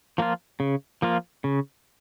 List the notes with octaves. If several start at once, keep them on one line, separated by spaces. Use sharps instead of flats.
F3 A#3 F4
C#3
F3 A#3 F4
C#3